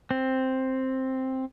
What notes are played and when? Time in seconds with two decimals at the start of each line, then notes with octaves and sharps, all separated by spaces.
0.11 C4